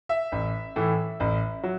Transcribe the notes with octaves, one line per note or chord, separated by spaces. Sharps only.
E5
A1
A2 E3
A1
F#3